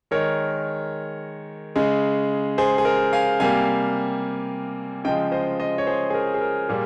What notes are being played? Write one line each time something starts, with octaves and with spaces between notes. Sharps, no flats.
D#3 G#3 A#4 C#5
C#3 G#3
G#4 C5
G#4
A#4
F5 G#5
C3 G3 A#3 F5 G#5
C#3 F3 G#3 D#5 G5
C5 D#5
C5 D#5
C#5
G#4 C5
G#4
A#4
G#4
A#4
A#2 G3 A#3 G#4